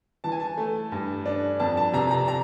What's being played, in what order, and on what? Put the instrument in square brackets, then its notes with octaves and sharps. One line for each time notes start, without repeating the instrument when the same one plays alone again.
[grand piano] E3 A5
G#5
A5
A3
G2
D4
F2 A5
A5
C3 A#5
A#5
A#5